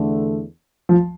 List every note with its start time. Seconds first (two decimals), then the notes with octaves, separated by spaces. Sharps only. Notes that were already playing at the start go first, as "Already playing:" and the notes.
Already playing: E2 D3 A3
0.89 F3